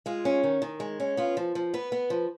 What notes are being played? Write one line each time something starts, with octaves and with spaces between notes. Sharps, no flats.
G#3 F4
C#4
D#3
D#3
G#3
C#4
B3 F4
F3
F3
B3 B4
B3
F3